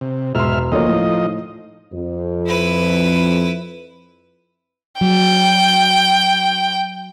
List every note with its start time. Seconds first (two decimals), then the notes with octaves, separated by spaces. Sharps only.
0.01 C3
0.35 E1 G#2 E5 C6 F6
0.72 D2 F3 A#3 D#4 C#5 D#5
0.89 A2
1.92 F2
2.46 E4 B4
5.01 F#3 G5